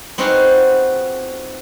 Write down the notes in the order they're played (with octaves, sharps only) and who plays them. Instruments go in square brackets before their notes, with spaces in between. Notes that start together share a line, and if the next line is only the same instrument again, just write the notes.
[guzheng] B3 C4 D#4 F4 F#4 G#4